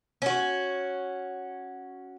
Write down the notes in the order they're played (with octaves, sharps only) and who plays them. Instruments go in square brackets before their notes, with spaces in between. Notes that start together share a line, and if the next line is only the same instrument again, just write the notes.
[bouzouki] C#4 F#4